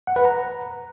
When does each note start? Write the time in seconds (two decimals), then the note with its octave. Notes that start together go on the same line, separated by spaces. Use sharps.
0.07 F#5
0.16 B4
0.25 A#5